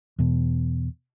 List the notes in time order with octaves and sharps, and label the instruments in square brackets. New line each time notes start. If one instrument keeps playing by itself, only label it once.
[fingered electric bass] E2 B2